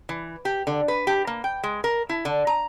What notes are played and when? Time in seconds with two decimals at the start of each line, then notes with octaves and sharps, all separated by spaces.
0.09 E3
0.45 G4
0.67 D3
0.88 B4
1.07 G4
1.27 A#3
1.44 G5
1.63 G#3
1.84 A#4
2.09 E4
2.25 D3
2.47 A#5